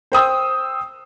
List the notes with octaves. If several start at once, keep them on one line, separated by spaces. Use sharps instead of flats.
C5 G5 D#6 E6